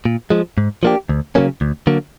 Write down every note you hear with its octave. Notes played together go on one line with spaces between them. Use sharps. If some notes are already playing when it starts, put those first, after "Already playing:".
A#2
F3 G#3
G#2
F3 A#3 D4 G4
D2
C#3 F#3 A#3 C#4
D2
D3 F#3 A#3